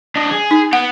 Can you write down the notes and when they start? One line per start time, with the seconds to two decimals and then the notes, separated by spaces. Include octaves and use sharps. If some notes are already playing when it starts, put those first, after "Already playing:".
0.16 D4 D#5
0.31 G#4
0.51 D#4
0.73 B3 F#5